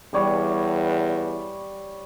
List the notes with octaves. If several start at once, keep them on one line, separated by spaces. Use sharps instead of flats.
E2 G3 C#5